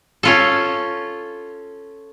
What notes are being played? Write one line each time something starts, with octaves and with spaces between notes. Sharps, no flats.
C#4 F4 A4